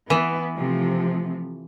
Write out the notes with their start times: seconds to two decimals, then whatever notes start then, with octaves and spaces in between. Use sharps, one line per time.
0.10 E3 B3 E4
0.56 C3 F3 A3